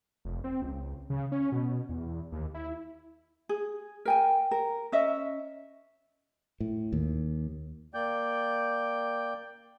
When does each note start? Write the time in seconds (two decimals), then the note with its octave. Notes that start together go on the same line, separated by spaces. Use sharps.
0.25 F1
0.44 C4
0.62 C#2
1.10 C#3
1.32 C#4
1.52 B2
1.89 E2
2.32 D#2
2.54 E4
3.49 G#4
4.05 A#4 G5 G#5
4.51 A#4
4.92 C#4 D#5 E5
6.60 A2
6.93 D#2
7.94 A#3 D5 G5 G6